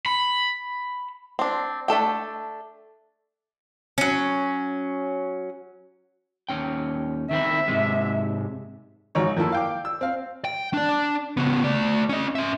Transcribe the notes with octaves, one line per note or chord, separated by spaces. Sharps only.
B5
C4 D4
A3 D4 A4 G5
F#3 C#4
D#2 C#4 G5
D#3 C4 E4 E5
G#2 C3 G#3
G#1 F#3 D#4 C#5
D#3 F3 A#3 E4 A4
F5 G5 D6
E6
C4 F5
G5
D4 D5
C#3 B3
A3 D5
C#4 D#5
C#4 E5